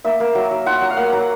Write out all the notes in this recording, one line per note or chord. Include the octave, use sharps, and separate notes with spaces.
A#3 E5
A#3
F#3
F#3
F4 F#5
F#3
F5
A#3 F#5
F#3